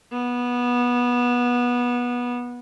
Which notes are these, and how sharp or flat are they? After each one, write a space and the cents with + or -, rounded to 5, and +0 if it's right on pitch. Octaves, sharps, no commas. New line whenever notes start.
B3 -20